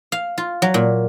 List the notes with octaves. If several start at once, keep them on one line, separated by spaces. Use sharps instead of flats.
F5
F4
F#3
A#2